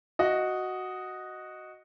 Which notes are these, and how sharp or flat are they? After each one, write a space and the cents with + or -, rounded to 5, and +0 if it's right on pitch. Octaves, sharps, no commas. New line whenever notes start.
F#4 +0 D#5 +0